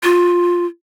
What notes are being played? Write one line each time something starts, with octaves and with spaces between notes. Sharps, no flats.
F4